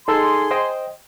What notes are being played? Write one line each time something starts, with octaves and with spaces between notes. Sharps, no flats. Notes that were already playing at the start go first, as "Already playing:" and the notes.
D#4 G#4 A4 C6
C5 D#5 G5